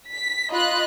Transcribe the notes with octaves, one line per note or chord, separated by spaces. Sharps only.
B6
F4 D#5 B5 F#6